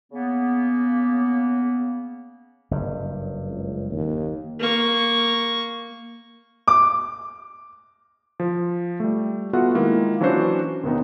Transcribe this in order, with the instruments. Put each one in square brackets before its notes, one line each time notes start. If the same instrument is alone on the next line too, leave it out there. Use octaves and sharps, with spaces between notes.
[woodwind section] C#3 A#3 B3
[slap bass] F#1 G2
[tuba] C#2
D#2
[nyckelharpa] A#3 C#6
[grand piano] D6
[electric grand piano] F3
G3 A3
B3 F4 F#4 A4 E5 F#5
D#3 G#3 A#3 E4 F4
E3 F#3 C#4 D4 F#4 C5
D#2 C3 B3 D#4